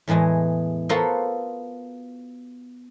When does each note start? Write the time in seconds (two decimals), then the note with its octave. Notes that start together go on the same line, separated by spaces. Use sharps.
0.08 E2 A2 E3 G#3 D#5
0.89 B3 F4 F#4 A4 A#4 C5